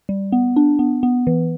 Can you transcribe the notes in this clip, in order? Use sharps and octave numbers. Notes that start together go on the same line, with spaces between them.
G3
B3
D4
B3
B3
E3